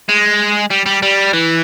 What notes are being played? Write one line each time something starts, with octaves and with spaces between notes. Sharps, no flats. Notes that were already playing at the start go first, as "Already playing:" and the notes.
G#3
G3
G3
G3
E3